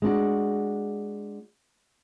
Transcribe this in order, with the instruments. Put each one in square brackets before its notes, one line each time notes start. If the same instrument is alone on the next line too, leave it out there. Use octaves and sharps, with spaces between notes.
[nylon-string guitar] G#3 D4 F#4